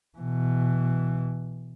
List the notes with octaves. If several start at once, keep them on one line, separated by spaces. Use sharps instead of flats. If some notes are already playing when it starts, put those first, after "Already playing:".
B2 E3